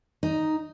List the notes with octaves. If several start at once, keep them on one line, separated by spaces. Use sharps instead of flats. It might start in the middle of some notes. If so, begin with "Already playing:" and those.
D#4